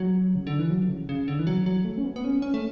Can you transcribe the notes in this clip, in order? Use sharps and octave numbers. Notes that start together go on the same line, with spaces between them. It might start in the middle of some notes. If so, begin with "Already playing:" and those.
Already playing: F#3
C#3
D3
E3
F#3
C#3
C#3
D3
E3
F#3
F#3
A3
C#4
B3
B3
C#4
C#4
A3